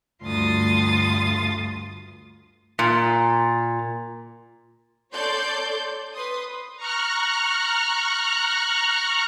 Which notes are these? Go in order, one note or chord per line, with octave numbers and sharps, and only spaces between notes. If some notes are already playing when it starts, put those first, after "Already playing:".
D2 G2 F4 C6 D#6 A6
A#2
A4 C#5 D5 C6 G6
B4 C6 D#6
A#5 C#6 F6 F#6